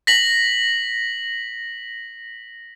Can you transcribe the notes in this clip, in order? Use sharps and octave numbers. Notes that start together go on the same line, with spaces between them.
A#6 B6 F#7